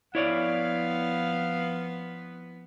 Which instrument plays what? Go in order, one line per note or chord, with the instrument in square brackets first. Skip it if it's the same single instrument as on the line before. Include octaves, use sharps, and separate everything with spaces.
[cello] F3 B3 [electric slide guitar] E4 C#5 D5 [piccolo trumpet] F5